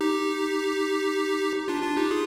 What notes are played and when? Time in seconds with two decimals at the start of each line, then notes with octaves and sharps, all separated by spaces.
0.01 D#4 G4
1.68 D4 F4
1.82 D4 F4
1.97 D#4 G4
2.11 F4 G#4